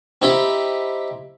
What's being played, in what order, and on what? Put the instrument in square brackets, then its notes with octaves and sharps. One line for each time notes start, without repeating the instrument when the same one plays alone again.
[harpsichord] C4 D#4 E4 G4 G5 B5